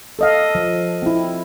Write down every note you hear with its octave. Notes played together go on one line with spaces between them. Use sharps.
A4 D#5 F5
F3
C4 E4